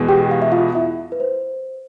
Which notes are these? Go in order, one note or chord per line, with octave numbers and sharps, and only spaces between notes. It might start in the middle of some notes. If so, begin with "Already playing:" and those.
Already playing: E2 B2 G#3 B3
G4 G5
F5
E5
F4 F5
E4 E5
B4
C5